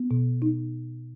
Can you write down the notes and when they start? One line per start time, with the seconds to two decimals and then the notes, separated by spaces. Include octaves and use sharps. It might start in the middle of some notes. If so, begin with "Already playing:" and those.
Already playing: B3
0.11 B2
0.42 D#4